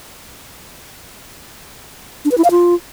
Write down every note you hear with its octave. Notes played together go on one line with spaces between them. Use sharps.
D4
B4
E4
F5
F4